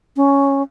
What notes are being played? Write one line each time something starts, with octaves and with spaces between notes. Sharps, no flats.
C#4